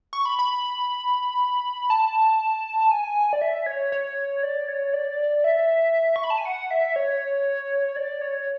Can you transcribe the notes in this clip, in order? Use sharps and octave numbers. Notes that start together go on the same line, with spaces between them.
C#6
B5
B5
A5
G#5
D5
E5
C#5
C#5
D5
C#5
D5
E5
C#6
B5
A5
G#5
F#5
E5
C#5
D5
C#5